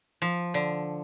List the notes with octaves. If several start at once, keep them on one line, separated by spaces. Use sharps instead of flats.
F3
D3